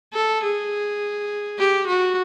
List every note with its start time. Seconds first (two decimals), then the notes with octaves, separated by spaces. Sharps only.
0.14 A4
0.43 G#4
1.58 G4
1.87 F#4